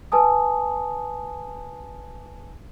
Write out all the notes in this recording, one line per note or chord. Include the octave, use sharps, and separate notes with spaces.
B4 G#5 A5 D#6